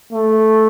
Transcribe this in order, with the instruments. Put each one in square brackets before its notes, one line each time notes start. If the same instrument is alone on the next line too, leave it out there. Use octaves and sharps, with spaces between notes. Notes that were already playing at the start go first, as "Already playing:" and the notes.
[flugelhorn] A3